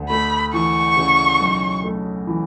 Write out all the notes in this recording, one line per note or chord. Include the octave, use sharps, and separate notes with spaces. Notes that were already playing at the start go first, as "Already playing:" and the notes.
Already playing: D2
A3 B5
E3 C#6
C#3
B1
A3
E3